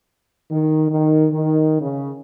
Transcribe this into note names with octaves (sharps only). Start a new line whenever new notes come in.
D#3
D#3
D#3
C#3